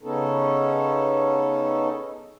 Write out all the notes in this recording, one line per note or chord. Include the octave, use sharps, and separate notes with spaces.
C#3 B3 C#4 D#4 A4